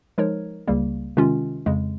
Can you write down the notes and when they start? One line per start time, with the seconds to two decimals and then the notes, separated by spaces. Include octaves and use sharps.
0.18 F3 G#3 D#4 A#4 C#5
0.67 C#2 C#3 G3 A#3
1.17 C3 D#3 G#3 C#4 F4
1.66 F2 C#3 G#3